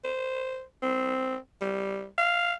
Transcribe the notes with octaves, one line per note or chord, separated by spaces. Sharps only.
C5
C4
G3
F5